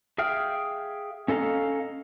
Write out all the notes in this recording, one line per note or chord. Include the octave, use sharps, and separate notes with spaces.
G#4 E5 F5 G5 F6
C#4 A4 D#5 F5 A#5